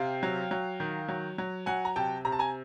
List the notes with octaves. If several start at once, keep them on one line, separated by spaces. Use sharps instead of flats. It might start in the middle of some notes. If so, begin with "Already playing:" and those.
Already playing: C3 F5 G5
F#3
F#3
D#3
F#3
F#3
F#3 F#5 G#5
A#5
C3 G5 A5
C3 A#5
A5
G#5 A#5